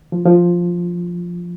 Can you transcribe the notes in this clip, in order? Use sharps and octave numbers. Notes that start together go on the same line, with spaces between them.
F3
F3